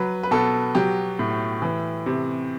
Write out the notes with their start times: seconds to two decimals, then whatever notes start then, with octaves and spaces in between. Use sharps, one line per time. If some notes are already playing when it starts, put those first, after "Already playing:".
Already playing: F#3 B4
0.23 B4
0.31 B2 A4
0.75 F#3 G4
1.19 A2
1.62 E3
2.06 C3